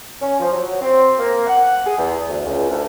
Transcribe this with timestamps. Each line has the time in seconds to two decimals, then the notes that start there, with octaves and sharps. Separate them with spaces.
0.21 C#4
0.39 F3
0.52 F#3
0.81 C4
1.19 A#3
1.47 F#5
1.86 G#4
1.98 E2
2.28 D2
2.45 C#2
2.69 D2